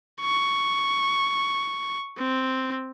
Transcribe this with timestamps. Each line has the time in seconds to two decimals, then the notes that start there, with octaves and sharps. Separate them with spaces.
0.22 C#6
2.18 C4